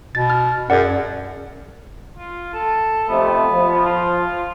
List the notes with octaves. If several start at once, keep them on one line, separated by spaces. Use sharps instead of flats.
B2 A6
F6
F#2 G#4 D5 F#5
F4
A4
F2 C3 A3 B3
F3
F4